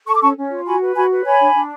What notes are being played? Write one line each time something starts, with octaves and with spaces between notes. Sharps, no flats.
A4 A5 C#6
D6
C#4 A5 C#6
C#4
F4
F#4 G#5 B5
B4
F#4 G#5 B5
B4
C#5 G#5 B5
D4
D4